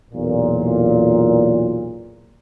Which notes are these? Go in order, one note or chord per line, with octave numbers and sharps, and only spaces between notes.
B1 E2 A#2